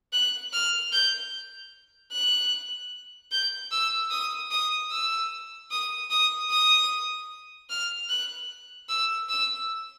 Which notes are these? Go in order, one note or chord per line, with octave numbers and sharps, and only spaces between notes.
F#6
F6
G6
F#6
G6
E6
D#6
D#6
E6
D#6
D#6
D#6
F6
F#6
E6
E6